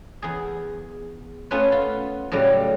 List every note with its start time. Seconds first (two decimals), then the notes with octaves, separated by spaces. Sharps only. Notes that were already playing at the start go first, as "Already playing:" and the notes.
0.22 E2 G#4
1.51 A3 B3 C#4 F4 B4 C#5
1.72 F4
2.32 A2 C#3 F#3 G3